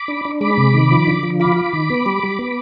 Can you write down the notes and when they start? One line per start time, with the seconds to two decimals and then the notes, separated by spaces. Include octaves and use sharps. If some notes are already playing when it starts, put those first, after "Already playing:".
Already playing: B5 D6
0.08 D4
0.25 D4
0.41 G#3 B5 D6
0.58 C3
0.74 D#3
0.91 F3
1.07 D3
1.23 F3
1.40 F4 B5 D6
1.56 F4
1.73 D#3
1.90 B3
2.06 G3
2.23 G3
2.39 B3